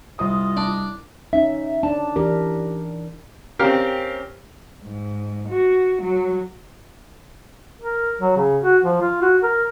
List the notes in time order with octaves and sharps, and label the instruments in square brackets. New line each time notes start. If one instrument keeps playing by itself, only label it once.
[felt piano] C2 D#6 [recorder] F4 [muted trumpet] D#5
[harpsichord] D4
[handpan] C#4 D#4 [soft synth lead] E5
[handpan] D4 [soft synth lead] A5
[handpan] E3 D4 A#4 [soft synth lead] G4
[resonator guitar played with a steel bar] C4 C#4 [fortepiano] G4 A#4 F5
[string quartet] G#2
F#4
F#3
[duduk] A#4
F#3
C#3
F#4
F3
F4
F#4
A#4